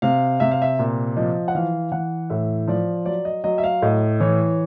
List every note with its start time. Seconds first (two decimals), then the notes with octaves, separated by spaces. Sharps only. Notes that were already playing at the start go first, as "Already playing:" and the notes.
0.02 C3 F5
0.40 C3 E5
0.51 F5
0.62 E5
0.79 A#2
1.17 F3 D#5
1.48 F#5
1.55 E3 F5
1.92 E3 F#5
2.30 A2 E5
2.68 F3 D5
3.06 F#3 D5
3.25 D#5
3.44 F#3 D#5
3.58 E5
3.64 F5
3.82 A2 D#5
4.20 E3 C#5